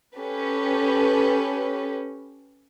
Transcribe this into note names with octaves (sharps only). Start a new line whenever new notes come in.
C#4 G4 A4 B4